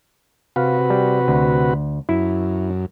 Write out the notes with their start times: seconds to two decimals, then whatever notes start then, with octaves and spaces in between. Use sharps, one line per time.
0.56 C3 F#4 B4 F5
0.90 G3
1.28 D2
2.09 F#2 E4